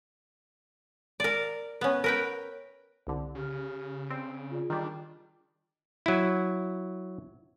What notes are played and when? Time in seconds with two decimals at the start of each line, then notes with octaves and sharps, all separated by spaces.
1.20 A#4 D5
1.81 B3 C#4
2.04 A#4 B4 G5
3.07 C2 D3
3.35 C#3 G4 F6
4.10 C4 D5 D7
4.51 F4 G#4 D5
4.70 D#3 G3 D4
6.06 F#3 E4